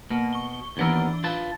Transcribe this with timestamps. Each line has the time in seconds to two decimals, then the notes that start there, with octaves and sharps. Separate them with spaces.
0.11 B2 A#3
0.33 C#6 G7
0.77 D#2 E3 B3 D4 A#4 G7
1.24 F4 B4 A5